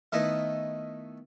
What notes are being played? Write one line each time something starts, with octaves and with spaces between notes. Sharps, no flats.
D#3 A3 B3 D#4 E4